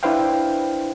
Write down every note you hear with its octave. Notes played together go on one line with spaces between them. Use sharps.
D4 E4 B4 C5 F5 G5